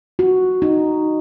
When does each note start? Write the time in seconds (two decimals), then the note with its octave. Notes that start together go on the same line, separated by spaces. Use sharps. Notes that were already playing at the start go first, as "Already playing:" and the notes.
0.19 F#4
0.62 D#4